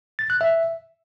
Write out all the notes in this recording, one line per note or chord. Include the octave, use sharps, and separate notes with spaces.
A6
F#6
E5